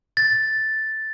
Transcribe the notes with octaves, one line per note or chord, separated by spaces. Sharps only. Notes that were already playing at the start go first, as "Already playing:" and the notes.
A6